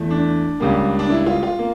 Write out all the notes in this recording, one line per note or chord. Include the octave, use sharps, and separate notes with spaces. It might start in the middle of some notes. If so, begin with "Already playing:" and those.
Already playing: E2 E3 A3
D4
C#2 C#3 G3 A#3
D4
E4
F4
F4
A#3